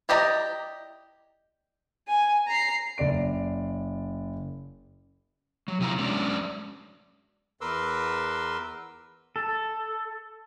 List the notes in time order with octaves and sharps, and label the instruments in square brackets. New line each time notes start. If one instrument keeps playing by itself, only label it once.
[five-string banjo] E4 G4 D5 D#5 A#5
[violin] G#5
A#5 C7
[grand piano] F#1 D5 D7
[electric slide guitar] F#3
C3 E4 F4 G#5 A#5
F#3 G#3 C#4 D4 D5
[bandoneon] E2 A#4 B4 C6 D6 E6
[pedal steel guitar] A4